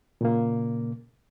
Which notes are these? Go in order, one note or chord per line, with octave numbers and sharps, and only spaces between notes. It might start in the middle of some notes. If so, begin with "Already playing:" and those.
A#2 C#3 A#3